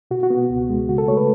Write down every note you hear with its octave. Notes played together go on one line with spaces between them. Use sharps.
B2 F#4
F#4
B3
C#2
G#3
C#3 F#4
A4
A3 C#5
B4